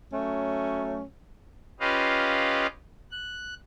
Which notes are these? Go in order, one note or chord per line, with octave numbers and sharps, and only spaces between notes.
F#3 A3 C#4
C#4 F4 G4 B4 D#5 F5
F#6